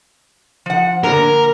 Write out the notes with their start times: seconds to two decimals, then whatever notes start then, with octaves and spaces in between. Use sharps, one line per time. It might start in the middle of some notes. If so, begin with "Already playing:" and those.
0.66 F3 F#5
1.04 A#2 D3 A#4 A#5